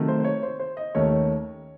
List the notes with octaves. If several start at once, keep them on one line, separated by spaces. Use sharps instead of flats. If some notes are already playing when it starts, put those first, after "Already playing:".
Already playing: C3 D#3 F#3 A3
C5
C5
C#5
C5
C5
D#5
D#2 D#3 A3 C#4 C#5